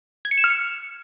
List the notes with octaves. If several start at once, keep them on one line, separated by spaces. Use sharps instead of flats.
G#6
C#7
E7
F6
C#7